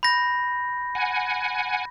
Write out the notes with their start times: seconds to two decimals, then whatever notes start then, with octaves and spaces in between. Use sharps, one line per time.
0.03 B5 G6 A#6
0.95 F#5 G#5